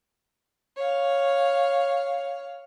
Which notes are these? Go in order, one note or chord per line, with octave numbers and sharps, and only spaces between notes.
C#5 F5